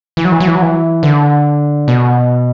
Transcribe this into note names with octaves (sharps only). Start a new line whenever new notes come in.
E3
F#3
E3
F#3
E3
F#3
E3
D3
B2